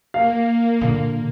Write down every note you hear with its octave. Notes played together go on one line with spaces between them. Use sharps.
A#3 F5
A#2 D3